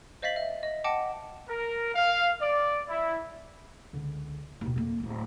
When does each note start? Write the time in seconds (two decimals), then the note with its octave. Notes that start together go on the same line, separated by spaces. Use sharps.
0.22 C5 D#5 F5 A6 B6 F#7
0.36 E5
0.63 D#5
0.84 D#5 F#5 G5 A5 D6
1.48 A#4
1.95 F5
2.40 D5
2.89 E4
3.93 C#2 D3
4.61 D#2 B2
4.76 F2 A#3
5.00 D1 G#1